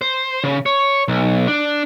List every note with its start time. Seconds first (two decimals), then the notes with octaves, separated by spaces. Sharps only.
0.01 C5
0.44 C#3
0.66 C#5
1.08 B1
1.48 D4